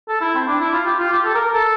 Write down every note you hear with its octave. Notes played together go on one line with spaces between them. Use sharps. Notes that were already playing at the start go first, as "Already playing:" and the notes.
A4
E4
C4
D4
E4
F4
G4
F4
G4
A4
A#4
A#4
A4